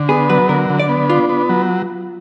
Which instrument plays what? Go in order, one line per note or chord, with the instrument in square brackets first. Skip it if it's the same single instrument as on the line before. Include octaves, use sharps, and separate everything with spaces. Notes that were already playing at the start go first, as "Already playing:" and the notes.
Already playing: [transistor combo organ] D3
[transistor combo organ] B3 [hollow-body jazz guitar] G#4
[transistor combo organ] F#3 [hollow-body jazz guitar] B4
[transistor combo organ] D3 [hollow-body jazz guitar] A#4
[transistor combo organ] D3
[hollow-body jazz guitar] D5
[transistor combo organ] B3
[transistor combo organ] D4 [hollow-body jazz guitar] F4
[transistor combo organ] B3
F#3